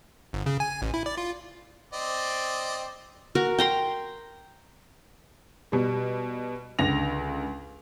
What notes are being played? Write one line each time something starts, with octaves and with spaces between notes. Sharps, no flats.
G1
C#3
G#5
A1
E4
D5
F4
C4 D5 D#5
F#4 A#4
G5 A#5 C6
B2 G3
C#2 D3 A#6 F7